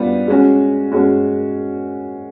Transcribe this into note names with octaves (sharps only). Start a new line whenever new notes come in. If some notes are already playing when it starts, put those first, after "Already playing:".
Already playing: G3 B3 D4 F4
G#3 C#4 F#4
G#3 C#4 F#4